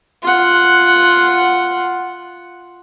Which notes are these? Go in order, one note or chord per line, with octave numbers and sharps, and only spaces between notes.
F4 F#5